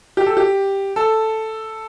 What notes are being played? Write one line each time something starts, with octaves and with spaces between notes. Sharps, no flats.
G4
A4
G4
A4